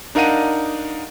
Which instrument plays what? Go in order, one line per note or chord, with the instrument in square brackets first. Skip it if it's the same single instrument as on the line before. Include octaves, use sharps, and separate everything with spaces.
[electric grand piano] D4 D#4 A#4 F5 F#5 D#7